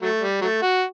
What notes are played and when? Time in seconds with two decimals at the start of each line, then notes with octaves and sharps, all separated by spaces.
0.02 F#3 A3
0.21 G3
0.41 F#3 A3
0.62 F#4